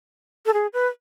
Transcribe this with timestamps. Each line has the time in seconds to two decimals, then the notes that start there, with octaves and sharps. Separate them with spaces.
0.46 A4
0.54 G#4
0.73 B4